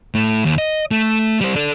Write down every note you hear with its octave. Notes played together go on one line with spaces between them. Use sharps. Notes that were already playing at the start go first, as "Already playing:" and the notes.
A2 A3
D#2
D#5
A3
G3 C5
A4 D5